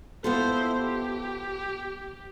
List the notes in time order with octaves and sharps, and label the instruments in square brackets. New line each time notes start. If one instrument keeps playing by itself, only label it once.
[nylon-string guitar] B3 F4 A4 [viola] E4 C5
[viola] G4